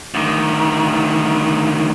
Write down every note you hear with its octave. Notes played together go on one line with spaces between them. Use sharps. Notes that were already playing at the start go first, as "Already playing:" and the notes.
D2 D#3